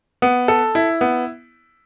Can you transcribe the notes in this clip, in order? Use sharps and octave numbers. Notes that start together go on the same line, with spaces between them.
B3
A4
E4
B3